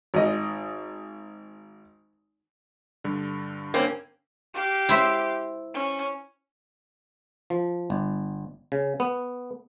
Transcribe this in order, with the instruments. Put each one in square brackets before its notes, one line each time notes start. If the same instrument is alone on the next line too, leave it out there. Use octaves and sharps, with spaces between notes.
[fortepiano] G#1 D#5
[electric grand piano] G2 D3
[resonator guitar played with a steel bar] A#3 C4 C#4
[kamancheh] G4 F5
[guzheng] E4 C5 E5
[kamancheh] C#4
[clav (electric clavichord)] F3
G1
C#3
B3